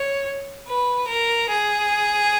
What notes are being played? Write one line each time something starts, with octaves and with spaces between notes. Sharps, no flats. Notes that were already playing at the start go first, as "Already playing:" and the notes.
Already playing: C#5
B4
A#4
G#4